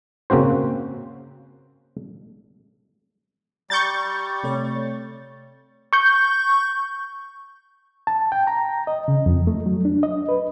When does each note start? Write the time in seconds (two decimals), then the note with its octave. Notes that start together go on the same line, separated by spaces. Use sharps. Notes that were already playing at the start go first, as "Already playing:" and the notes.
0.30 C#3 A#3 C4 F#4 C5
3.70 G3 A#5 C#6 G6 A6
4.44 C3 A3 C#5
5.93 C#6 G6
8.07 A5
8.32 G5
8.47 A#5
8.87 D#5
9.08 C#3
9.26 F2
9.47 A3
9.66 F#3
9.85 D4
10.03 D#5
10.29 B4